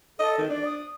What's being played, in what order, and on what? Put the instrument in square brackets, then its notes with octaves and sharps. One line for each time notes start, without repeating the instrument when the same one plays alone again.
[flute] A4 [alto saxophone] D#5
[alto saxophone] D#3
[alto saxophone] D4 [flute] D5
[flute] D#6